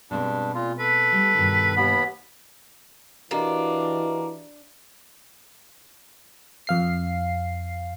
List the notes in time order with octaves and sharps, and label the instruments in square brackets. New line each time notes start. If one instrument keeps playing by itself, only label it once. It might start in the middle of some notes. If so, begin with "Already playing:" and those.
[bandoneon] G2 D4 [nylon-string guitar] B2 G#3 C4
[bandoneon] A#2 F4
[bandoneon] A4 [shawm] B4
[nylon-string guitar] G3 A3
G2 B2 D#3
[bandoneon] D#2 B3 [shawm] B5
[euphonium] E3 [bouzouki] A#3 [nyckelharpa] D4 [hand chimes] F#4 G4 D#5
[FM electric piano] F2 F5 C7